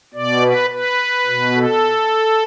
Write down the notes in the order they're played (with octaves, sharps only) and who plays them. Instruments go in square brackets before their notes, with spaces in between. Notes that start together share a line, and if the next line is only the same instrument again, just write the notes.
[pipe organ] B2 D5
B4
B4
B2
A4